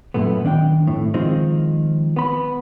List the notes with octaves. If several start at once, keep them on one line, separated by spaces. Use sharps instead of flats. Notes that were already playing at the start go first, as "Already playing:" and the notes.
F#2 A#2 A3 B3
D#3 D4 F5 G5
F2 A2
D#3 F3 G#3 C4 D#4
B3 B5